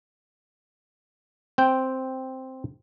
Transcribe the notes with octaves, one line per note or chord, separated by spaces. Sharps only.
C4 G5